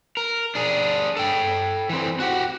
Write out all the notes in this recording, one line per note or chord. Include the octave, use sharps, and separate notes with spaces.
A#4
D4 G#4
A4 G5
E3 C4
F#4 G4